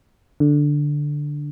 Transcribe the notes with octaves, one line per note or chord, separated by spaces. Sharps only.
D3